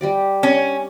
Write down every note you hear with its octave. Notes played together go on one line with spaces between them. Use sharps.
G3 G4 D5
C#4